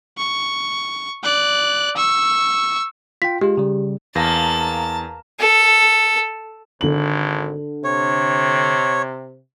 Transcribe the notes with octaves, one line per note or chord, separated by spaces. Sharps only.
C#6
D5 F#6
C#6 E6
F4 G5 B6
G#3 F4 G4
C#3 G3
E2 A#3 A5 A#6
A4
G#1 D3 F#7
C3 C#5